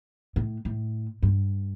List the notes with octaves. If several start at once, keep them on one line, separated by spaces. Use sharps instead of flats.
A2
A2
G2